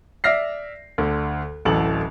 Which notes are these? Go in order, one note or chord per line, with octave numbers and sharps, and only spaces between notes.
D5 E5 F6 A#6 C7
D2 D3
D1 A1 A4 F#7